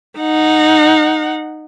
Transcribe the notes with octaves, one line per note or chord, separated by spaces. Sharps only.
D#4 F#5